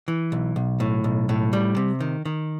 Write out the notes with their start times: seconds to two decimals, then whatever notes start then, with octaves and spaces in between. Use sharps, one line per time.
0.08 E3
0.32 B1
0.56 B1
0.80 A2
1.04 B1
1.29 A2
1.53 G3
1.77 C3
2.00 D#3
2.25 D#3